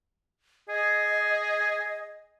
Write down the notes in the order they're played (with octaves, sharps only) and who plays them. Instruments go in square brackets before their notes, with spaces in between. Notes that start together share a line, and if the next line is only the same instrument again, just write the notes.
[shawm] G#4 [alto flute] D#5